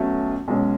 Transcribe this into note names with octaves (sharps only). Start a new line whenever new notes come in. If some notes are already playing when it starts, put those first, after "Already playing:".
Already playing: B1 B2 F#3 A3 C#4
B1 B2 G#3 C#4